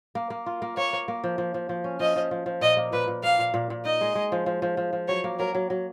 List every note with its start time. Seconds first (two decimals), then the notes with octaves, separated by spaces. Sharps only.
0.15 A#3
0.30 A#3
0.46 F4
0.62 A#3
0.77 A#3 C#5
0.93 A#3
1.08 A#3
1.24 F3
1.38 F3
1.54 F3
1.69 F3
1.84 C#4
2.00 F3 D#5
2.16 F3
2.31 F3
2.46 F3
2.61 A#2 D#5
2.77 A#3
2.93 A#2 B4
3.08 A#2
3.23 A#3 F5
3.39 A#2
3.54 A#2
3.70 A#2
3.85 D#4 D#5
4.01 G#3
4.15 G#3
4.32 F3
4.46 F3
4.62 F3
4.77 F3
4.93 F3
5.08 F#3 C#5
5.24 A#3
5.39 F#3 A#4
5.55 F#3
5.70 F#3